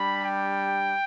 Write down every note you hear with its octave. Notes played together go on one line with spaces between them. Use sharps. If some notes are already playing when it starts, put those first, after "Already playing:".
Already playing: G3 D4 G4 B5
G5